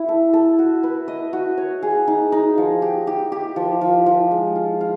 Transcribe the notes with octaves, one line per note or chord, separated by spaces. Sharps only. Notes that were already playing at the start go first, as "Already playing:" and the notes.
Already playing: E4
A4
A4
F#4
B4
D#5
F#4
C#5
G#4
D#4
D#4
F3
G4
G4
G4
F3
F3
F3
G#3
F4
F4